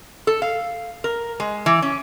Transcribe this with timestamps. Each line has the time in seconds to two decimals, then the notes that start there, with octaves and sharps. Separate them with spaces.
0.27 A4
0.42 F5
1.04 A#4
1.40 G#3
1.66 E3
1.82 C#4